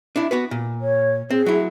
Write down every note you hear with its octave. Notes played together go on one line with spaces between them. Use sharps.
D4 E4
B3 F#4 B4
A#2
C#5
C4 G#4
F#3 E4